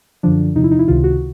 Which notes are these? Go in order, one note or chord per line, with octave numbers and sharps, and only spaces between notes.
F#2 D3 F3 D4
E2 C3 F3 D#4
E4
D#4
E4
C#2 C3 D#3 F4
F#4